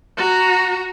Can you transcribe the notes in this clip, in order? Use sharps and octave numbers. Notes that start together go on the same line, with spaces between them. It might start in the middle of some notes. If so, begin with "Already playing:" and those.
F#4 A#5